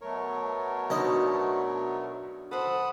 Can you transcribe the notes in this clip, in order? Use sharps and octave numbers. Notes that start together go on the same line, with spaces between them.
B2 F#3 A3 A#4 C#5
B1 D4 D#5
A4 C5 F#5 B5 D#6